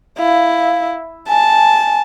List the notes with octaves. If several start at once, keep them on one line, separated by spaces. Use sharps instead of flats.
E4 F5
G#5 A5